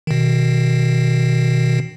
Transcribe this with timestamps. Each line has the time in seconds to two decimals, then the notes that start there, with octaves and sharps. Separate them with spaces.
0.07 B2 D#3